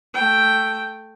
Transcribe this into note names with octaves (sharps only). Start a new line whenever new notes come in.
A3 G5